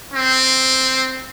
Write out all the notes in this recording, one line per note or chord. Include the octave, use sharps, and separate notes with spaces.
C4